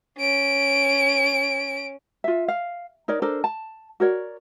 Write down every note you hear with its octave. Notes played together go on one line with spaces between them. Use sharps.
C#4 D7
F4 E5
F5
D#4 A#4 C#5 D5
D4 A4 A#4 C5
A5
F#4 A#4 C#5 D5